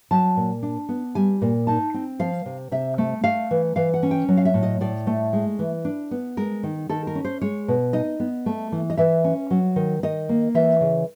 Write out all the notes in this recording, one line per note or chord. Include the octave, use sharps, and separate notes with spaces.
F#3 A5
A#2
D4
B3
G3 G#5
A#2
D#4 A5
C4
F3 F5
C3
C3 E5
A3
A3 F5
E3
E3 F5
F#5
C#4
G5
F#3
F5
E5
A2
D#5
A2 D5
A3
G#3
E3
D4
B3
G#3 A#4
D#3
D#3 A4
A#4
C#4
C5
G#3 C#5
B2
D#4 D#5
B3
A3
E3
D#5
E3 E5
C#4
F#3
D#3
D#3 D#5
A#3
E3 E5
C#3